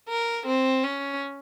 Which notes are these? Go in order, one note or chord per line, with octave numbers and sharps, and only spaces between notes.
A#4
C4
C#4